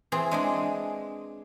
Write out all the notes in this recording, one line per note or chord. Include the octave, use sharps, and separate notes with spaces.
E3 C4 G#4
G#3 D4 G#4